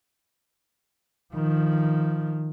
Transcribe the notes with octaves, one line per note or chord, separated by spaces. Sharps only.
D#3 F3